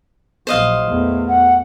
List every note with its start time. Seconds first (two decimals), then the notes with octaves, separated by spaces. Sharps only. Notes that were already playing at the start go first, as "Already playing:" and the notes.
0.47 A#1 F#3 C5 D#5 F5
0.88 E2 A3
1.28 F#5